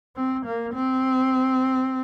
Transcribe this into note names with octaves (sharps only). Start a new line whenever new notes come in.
C4
A#3
C4